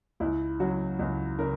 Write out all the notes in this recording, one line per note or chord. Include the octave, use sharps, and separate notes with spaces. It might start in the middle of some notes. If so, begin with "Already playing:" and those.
C#2 E4
C#3 F#3 F#4
C#2
C#3 A#4